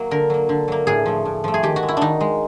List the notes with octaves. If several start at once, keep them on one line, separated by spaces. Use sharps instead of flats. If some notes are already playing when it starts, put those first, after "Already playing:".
Already playing: F#3 A#3
D3 A#4
F#3 A#3
D3
F#3 A#3
A2 G#4
F3 A3
A2
F3 A3
G#4
D#3 G4
F#4
G#3
E4
D#3 D4 D#4
G#3